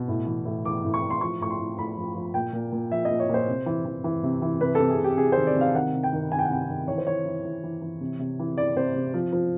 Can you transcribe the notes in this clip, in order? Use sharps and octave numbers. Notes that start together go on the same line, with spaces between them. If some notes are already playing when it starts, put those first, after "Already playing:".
Already playing: B2
A2
E3
A2
E3 D6
A2
C#6
A2
C6
F3 C#6
A2 C#6
C6
A2
A2 B5
F3
F3
A#2 G5
A#2
A#2
F3 E5
D#5
A#2
C#5
A#2 C5
C3
E3
E3
E3
C3
E3
C3 B4
C3 A4
G#4
C3 G4
C3 G#4
D#3 C5
D5
C3 F5
D#3 F#5
C3
G5
D#3
D#3 G#5
G5
F#5
C3 G5
D#3
E3 C#5
C5
E3 C#5
E3
E3
E3
E3
C3
C3
E3
E3 D5
C3 C5
C3
F3
F3